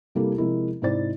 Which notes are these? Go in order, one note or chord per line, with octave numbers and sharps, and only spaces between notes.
C3 G3 A#3 E4 G4 A4
C3 F3 G#3 E4 A#4
G#2 C3 E4 C5 D5 A6